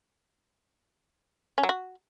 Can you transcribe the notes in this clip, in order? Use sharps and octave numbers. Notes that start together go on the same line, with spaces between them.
C#4
F#3
F#4